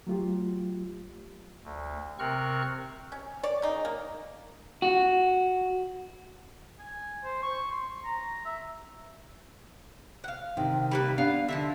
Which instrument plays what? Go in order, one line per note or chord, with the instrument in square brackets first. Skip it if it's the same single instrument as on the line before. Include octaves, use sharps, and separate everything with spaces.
[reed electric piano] F#3 A3 F4 G4
[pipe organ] D2
C3 C4 A#4 C#6 F6 F#6
[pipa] C#4
C#5 D5
C#3 D#4
A#3
[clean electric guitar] F#4
[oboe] G#5
C5
C#6
C6
A#5
E5
[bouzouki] F5 F#5
[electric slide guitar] C3 [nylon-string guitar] D#3
[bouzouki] G3 A#3 B4
[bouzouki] B3 [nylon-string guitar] D4 [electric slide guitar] F5
[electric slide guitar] D3 [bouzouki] F3 D#5 E5